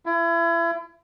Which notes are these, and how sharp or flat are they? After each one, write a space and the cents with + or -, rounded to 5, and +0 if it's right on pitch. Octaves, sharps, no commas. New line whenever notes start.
E4 +35